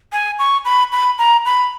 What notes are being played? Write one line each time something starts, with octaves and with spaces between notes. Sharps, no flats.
G#5
C#6
B5
B5
A#5
B5